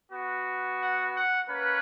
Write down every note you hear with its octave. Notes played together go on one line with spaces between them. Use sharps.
B3 F#4
F#5
F#5
A#3 C#4 B4